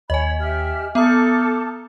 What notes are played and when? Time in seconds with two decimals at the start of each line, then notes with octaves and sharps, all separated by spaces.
0.10 D#2 C#5 D#5 G#5 B5
0.40 G4 E5 F6
0.95 B3 A4 A#5 D6 D#6 F6 G6